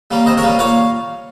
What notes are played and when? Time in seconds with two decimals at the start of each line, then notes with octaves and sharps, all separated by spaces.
0.11 G3 A#3 C#4
0.26 C3 C5 D#5
0.37 A#4 C#5
0.42 G3 A#3 C#4
0.59 A#2 C#5 F5